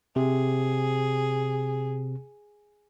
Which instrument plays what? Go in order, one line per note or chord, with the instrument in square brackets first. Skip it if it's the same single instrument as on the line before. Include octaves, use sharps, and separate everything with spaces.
[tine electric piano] C3 [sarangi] G#4